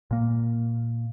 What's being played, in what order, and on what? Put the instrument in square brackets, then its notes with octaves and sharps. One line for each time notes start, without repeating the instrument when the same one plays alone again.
[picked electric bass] A#2 A#3